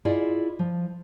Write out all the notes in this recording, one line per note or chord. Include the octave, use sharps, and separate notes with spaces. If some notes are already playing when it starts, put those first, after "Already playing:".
E4 F4 G#4 D5 D#5
F3